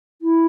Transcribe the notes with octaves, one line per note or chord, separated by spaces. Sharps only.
E4